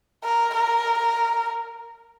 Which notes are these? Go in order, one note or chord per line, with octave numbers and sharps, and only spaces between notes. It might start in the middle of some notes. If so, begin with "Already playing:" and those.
A#4
A#4